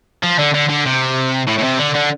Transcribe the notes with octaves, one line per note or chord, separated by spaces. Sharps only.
F3
D3
D3
D3
C3
A2
A2
C3
D3
D3